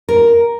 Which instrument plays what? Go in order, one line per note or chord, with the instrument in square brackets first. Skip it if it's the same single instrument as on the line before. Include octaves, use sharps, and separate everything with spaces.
[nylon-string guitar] A#4